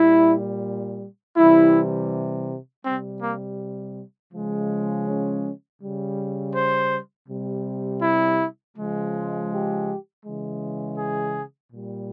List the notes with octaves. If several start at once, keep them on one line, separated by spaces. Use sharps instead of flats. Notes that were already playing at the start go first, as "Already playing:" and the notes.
Already playing: A#2 G3 E4
C3 E3 G3 E4
C3 G3 C4
A#3
C#3 F3 G#3
C#4
C#3 G3
C5
C3 G3
E4
C#3 F3 G#3
G4
C#3 E3 G#3
G#4
A#2 G3